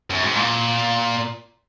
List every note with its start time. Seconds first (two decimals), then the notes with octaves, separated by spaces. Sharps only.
0.10 F#2
0.23 G#2
0.35 A#2